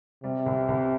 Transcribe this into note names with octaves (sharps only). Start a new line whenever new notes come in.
C3 G3
C2
C2